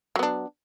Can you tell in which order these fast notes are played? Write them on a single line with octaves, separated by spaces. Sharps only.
F#3 B3 D4